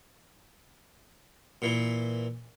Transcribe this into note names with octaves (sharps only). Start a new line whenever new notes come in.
A#2 E3